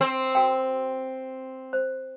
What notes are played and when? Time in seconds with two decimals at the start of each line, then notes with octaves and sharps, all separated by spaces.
0.01 C4
0.35 F#4 A#4 G5
1.73 C5